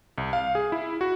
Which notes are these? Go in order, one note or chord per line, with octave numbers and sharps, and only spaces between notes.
C2
F5
G#4
E4
F#4